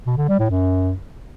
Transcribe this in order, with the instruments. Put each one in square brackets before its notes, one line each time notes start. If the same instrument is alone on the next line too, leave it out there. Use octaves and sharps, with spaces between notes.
[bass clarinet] B2
D3
G3
A2
F#2